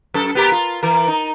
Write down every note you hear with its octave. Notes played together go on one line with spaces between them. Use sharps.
F#2 A4
B3 G4 A#4
F4
E3 A#4
D#4